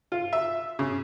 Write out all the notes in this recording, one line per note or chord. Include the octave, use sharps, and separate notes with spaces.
F4
E5
C#3